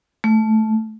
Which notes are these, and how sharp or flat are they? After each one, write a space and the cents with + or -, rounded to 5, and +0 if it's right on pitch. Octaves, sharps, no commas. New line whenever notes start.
A3 -10